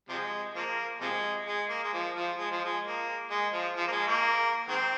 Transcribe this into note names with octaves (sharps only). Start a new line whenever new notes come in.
C3 F3 G#3
F3 A#3
C3 F3 G#3
G#3
A#3
G#3
F3
F3
G#3
F3
G#3
A#3
G#3
F3
F3
A#3
G#3
A#3
D#3 G#3 C4